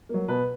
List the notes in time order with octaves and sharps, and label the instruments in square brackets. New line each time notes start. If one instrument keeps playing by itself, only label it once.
[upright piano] F#3 A#3
B2 B4